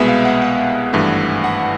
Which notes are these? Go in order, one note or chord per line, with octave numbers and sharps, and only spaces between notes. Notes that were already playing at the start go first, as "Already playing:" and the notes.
Already playing: C2 B2 G#3 B3 E5
F5
F#5
F#5
G#1 G2 E3 A3
F#5